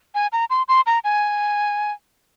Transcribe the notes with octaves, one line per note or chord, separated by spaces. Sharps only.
G#5
A#5
C6
C6
A#5
G#5